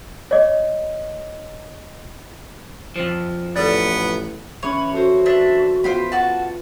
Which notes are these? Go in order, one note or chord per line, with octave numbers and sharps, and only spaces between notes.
C#5 D#5
F2 F3
A1 B3 A4 D5
E3 C#4 C#5 B5
F#4 A4 C5
D4 E5
B3 F4 C5 G5 B5
F#4 A5